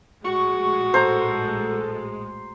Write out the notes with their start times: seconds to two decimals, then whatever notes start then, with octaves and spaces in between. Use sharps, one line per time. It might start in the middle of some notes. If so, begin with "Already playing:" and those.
0.24 A#1 A2 G#3 F#4 C#6
0.94 A4 C5 A#5